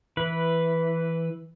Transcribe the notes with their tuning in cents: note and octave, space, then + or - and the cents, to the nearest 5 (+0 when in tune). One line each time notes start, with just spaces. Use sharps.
E3 +0 B4 +0